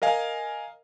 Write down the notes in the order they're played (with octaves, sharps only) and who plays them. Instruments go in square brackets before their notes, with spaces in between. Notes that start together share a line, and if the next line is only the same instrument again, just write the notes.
[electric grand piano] A#4 D#5 F5 G#5